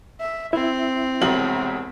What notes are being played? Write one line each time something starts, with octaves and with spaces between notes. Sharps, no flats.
E5
C4 E4 E5
E1 C2 F#7